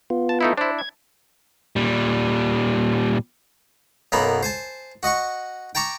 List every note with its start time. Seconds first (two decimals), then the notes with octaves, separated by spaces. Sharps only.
0.10 B3 F4
0.29 A5
0.41 A3 D#4 E4
0.58 D4 E4 C5
0.79 G#6
1.76 A#2 G3
4.12 B1 F#2 A#3 B3 D#4 B5
4.43 C5 G#5 A5
5.03 F#4 D#5 F#5 C#6
5.75 G5 A5 A#5 C#6 D6